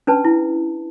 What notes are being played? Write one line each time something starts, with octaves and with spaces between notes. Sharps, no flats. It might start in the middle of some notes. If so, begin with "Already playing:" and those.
C#4 D4 B4 A5
E4